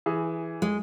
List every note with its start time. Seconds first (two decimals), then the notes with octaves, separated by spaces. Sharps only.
0.06 E3 G#4
0.62 G#3